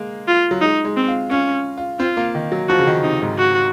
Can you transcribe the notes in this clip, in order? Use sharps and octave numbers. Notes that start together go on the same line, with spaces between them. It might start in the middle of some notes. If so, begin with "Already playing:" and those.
Already playing: G#3 A#3
F4
F#3
G#3 D#4
G#3
C4
F4
C#4 F4
F4
C4 F4
A#3
D#3
F#3
F3 F#4
C#3
D#3
C3 D#4
G#2
F#4